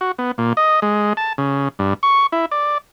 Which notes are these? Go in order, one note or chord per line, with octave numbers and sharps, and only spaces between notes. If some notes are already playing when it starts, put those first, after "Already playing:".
F#4
B3
A#2
D#5
G#3
A5
C#3
G2
C#6
E4
D5